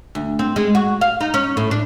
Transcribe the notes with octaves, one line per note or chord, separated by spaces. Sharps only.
D2
C4
G#3
F#4
F5
D#4
C#4
A2
D4